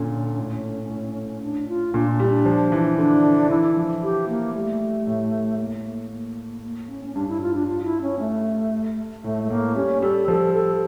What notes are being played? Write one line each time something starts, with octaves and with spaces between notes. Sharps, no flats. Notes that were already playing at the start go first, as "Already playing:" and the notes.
Already playing: A#2 D3 C#4
A2
A2
D4
F4
A#2 D4
D4
G3 E4
D4
F3
E3
D3 D4
E3 E4
F3
G4
A#3
G3 A3
A2
A#3
A#3
A#3
A#3
C#4
C#4
G2 D4
E4
F4
D4
F4
E4
C#4
A3
A2 A3
A3
A2 A#3
G3 C#4
G3 A4
F3 A4
A4